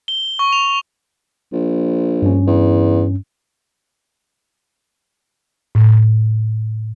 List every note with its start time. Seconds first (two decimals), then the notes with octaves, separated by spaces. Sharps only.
0.08 G7
0.39 C#6
0.53 F7
1.53 A#1
2.22 G2 C#4
2.47 E2
5.75 A2